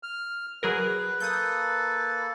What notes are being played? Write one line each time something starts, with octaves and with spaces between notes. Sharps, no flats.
F6
F#3 G#4 A#4 B4
A#3 A4 D#6 G6